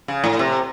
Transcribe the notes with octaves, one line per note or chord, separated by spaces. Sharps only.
C#3
A2
C3